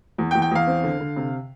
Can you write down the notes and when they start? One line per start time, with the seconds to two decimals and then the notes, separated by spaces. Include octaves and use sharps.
0.18 E2
0.31 G5
0.35 E2
0.42 G5
0.51 E2 F5
0.67 C4
0.83 D3
1.00 D3
1.16 C3